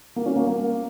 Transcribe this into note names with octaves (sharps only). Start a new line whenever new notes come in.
A#3
C#4
A#3
A#3